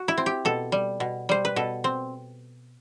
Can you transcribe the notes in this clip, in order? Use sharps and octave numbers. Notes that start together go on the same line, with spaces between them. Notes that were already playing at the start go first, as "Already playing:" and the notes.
Already playing: F#4
E4
C4
G4
B2 A4
G3
B2
G3 C5
B4
B2 A4
C4